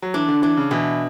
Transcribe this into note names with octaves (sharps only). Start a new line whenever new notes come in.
F#3
E3 D4
D3
E3 D4
C#3
B2 E3